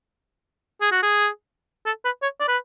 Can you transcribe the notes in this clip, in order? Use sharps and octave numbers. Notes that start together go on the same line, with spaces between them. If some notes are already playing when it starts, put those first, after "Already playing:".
G#4
F#4
G#4
A4
B4
C#5
D5
B4